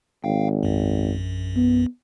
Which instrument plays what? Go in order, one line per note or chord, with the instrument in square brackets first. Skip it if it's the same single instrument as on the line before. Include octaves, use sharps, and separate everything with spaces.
[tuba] G#1 [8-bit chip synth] F5 G5
[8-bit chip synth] A#1 F#2
[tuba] B3